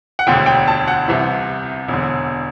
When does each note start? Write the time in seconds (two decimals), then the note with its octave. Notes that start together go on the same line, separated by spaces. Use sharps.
0.19 F#5
0.27 E1 D2 D3 G5
0.46 G5
0.68 A5
0.88 F#5
1.08 C2 C3 E3
1.88 E1 E2 D3